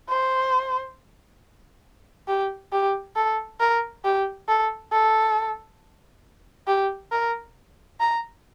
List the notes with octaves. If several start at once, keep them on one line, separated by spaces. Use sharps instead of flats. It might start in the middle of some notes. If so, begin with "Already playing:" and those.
C5
G4
G4
A4
A#4
G4
A4
A4
G4
A#4
A#5